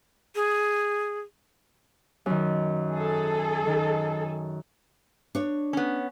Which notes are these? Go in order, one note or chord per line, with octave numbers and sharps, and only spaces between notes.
G#4
F#2 D#3
G#4 A4
D#3
D4 C#5
B3 C#4